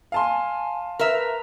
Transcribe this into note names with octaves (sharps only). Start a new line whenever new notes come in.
F5 G#5 A5 C6
A#4 B4 E5 A#5